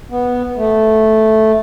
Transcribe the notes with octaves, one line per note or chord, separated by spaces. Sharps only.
B3
A3